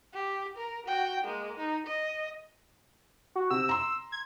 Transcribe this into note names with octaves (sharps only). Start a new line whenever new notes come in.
G4
A#4
F#4 G5
G#3 A#3
D#4
D#5
F#4
C3 E6
A#5 C6
G#6